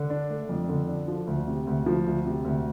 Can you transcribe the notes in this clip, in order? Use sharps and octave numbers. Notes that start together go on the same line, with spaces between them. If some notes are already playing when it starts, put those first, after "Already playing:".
Already playing: D3
D4
A3
F2
D3
D4
F3
D2
C3
D2
F3
D2
C3
D2